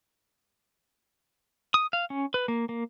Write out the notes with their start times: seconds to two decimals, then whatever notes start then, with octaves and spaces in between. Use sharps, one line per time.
1.74 D#6
1.93 F5
2.10 C#4
2.34 B4
2.48 A#3
2.69 A#3